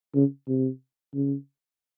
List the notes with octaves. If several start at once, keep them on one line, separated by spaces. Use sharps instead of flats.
C#3
C3
C#3